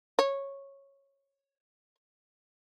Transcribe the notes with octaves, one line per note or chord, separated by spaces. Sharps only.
C#5